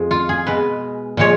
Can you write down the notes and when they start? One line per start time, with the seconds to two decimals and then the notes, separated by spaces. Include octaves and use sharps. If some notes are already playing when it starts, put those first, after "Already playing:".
Already playing: F2 F3 G#3
0.11 F4
0.29 G#4
0.47 B2 G#3 B4
1.17 A#2 F3 G#3 C#5